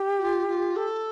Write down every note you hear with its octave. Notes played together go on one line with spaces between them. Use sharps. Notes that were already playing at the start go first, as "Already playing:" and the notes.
Already playing: G4
F#4
F4
F4
A4